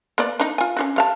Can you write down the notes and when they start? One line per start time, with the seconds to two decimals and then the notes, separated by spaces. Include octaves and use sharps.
0.18 A#3 B3 D5
0.40 D4 D#4
0.58 F4 G#5
0.77 C#4 D4 F#4
0.96 G3 F5 A5